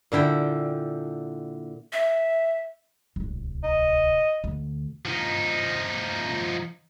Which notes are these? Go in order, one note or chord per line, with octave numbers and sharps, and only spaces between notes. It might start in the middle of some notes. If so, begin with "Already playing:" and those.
A#2 D3 E4 G5
E5
D1 C2
D#5
D2
F3 D#4